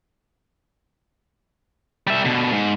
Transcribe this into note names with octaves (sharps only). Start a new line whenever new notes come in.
G3 E5
B2 D3
G#2